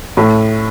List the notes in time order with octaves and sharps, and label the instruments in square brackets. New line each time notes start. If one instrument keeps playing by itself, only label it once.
[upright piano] A2 A3